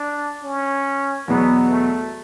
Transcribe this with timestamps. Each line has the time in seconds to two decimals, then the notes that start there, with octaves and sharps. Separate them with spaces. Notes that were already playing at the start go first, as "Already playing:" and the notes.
Already playing: D4
0.43 C#4
1.28 E2 B2 F#3 B3
1.70 A3